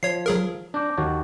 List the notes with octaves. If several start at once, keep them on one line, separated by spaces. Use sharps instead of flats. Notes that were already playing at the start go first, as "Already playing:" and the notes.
F3 C#5 C7
F#3 G#4 A#4
D4 D6 G6 A#6
D#2 F#4 C#5 A5